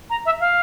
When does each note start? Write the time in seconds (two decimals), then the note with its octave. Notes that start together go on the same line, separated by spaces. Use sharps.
0.10 A#5
0.26 E5
0.40 F5